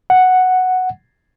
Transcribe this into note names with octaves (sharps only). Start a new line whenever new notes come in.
F#5